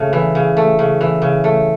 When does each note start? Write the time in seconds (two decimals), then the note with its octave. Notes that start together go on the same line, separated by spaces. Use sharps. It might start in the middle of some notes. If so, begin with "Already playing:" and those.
Already playing: C#3 A3
0.13 E3
0.35 C#3
0.57 A3
0.79 C#3
1.01 E3
1.22 C#3
1.44 A3